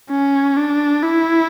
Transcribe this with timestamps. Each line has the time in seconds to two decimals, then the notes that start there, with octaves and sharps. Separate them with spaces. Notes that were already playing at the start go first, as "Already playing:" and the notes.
0.10 C#4
0.56 D4
1.02 E4